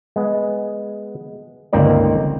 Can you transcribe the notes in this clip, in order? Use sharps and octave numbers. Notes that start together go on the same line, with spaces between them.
G#3 B3
G1 C#2 A#3 C4 D#4 D5